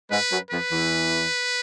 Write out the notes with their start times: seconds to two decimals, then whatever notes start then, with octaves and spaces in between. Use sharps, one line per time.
0.10 G#2 G#3 B4
0.31 F#2 F#3
0.50 F2 F3 B4
0.71 E2 E3